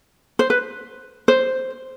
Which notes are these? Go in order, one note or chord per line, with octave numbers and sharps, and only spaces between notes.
C5
B4
C5